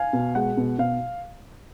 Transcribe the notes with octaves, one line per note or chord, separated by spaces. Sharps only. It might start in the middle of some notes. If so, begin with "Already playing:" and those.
Already playing: F5 G#5
B2
G#3 F#5
B2
B2 F5